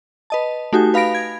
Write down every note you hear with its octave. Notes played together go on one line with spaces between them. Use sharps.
B4 D#5 A5
A3 D#4 F#4 G4 G#5
B4 F5 B5 A#6 D7
G#6